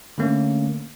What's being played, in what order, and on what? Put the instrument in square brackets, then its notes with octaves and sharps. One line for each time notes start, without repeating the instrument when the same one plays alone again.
[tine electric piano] D3 A3 A#3 C#4